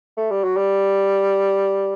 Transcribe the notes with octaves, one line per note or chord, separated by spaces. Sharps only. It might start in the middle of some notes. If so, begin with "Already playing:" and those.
A3
G3
F#3
G3